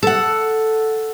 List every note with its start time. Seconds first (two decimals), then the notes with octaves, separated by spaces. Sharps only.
0.03 A4 F#5